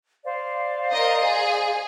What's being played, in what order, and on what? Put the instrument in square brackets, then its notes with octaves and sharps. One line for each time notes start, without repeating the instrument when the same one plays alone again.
[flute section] C5 D5 F5
[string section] A#4 D#5
G#4